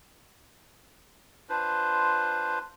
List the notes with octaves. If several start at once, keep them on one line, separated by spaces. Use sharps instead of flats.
D4 F4 B4 C5